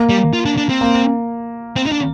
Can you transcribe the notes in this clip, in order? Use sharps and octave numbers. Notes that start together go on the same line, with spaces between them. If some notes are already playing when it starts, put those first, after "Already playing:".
Already playing: A#3
G3
F4
D4
D4
C4
A#3
C4
D#4
D4